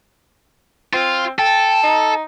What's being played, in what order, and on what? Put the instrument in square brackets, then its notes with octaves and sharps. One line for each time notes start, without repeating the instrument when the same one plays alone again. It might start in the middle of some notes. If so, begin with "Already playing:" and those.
[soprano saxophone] C4 [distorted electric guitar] F4
[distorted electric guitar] A4 [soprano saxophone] G5
[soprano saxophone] D#4